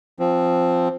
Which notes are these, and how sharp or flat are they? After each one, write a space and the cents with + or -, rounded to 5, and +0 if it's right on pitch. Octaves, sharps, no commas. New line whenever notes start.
F3 +0 C4 +0